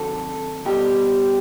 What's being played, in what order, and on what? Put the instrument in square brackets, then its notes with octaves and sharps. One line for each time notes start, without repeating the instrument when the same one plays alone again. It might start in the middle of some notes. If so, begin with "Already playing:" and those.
Already playing: [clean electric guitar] C3 D#3 F#3 A4
B2 G3 G4